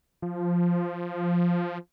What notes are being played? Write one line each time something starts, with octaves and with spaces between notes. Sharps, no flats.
F3